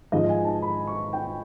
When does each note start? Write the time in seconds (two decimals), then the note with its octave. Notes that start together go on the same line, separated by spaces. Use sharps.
0.12 G#2 F3 G#3 D#5
0.29 G#5
0.45 A5
0.62 B5
0.87 C#6
1.13 G5